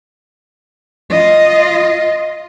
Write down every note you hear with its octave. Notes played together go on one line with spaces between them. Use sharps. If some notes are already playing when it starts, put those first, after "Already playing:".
F4 D#5